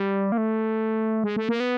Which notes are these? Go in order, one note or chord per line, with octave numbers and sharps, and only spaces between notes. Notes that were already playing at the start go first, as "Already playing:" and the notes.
Already playing: G3
A#3
A3
G#3
A3
A#3
B3